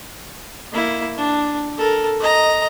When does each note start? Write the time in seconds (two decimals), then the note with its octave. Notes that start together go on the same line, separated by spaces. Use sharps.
0.72 A#3 E4
1.17 D4
1.77 A4 A#4
2.20 D#5 A#5